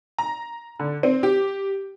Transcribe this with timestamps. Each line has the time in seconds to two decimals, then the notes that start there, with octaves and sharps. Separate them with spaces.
0.18 A#5
0.80 D3
1.03 C4
1.23 G4